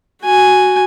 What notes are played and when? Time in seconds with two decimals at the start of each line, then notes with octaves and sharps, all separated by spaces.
0.23 F#4 G#5